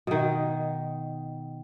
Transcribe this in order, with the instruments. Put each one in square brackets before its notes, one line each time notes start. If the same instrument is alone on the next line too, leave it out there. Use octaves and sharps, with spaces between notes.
[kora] B2 D#3